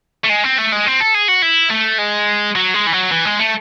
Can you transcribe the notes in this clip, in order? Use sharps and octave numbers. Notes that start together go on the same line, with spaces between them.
A3
G#3
C4
A3
G#3
C4
A4
G#4
F#4
E4
A3
G#3
F#3
G#3
E3
F#3
E3
G#3
A3